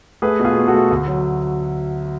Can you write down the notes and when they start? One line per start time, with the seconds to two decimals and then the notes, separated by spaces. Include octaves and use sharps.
0.22 A3 G#4 B4
0.39 B2
0.45 F4 G#4
0.57 B2
0.67 F#4 A4
0.74 A3
0.91 D2
1.08 F#3